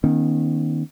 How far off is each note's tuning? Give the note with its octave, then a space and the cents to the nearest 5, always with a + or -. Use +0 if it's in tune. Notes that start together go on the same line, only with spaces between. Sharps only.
D#3 +0 A#3 +45 C#4 -40